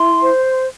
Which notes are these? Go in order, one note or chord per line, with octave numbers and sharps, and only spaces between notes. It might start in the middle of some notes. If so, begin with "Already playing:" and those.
Already playing: E4 C6
C5